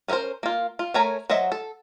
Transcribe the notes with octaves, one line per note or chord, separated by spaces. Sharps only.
C#4 D#4 E4 A#4 C5
A#3 F4
F4
A3 A#4 C#5 G#5 A#5
F#3 F#4 C5 D#5 E5
A4